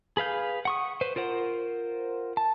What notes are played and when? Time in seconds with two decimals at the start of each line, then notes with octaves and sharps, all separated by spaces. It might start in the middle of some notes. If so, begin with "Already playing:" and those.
0.17 G#4 B4 F5 G6
0.65 F#5 C#6 D#6
1.01 B4 C5
1.16 F4 A#4 C5 F#5
2.37 A5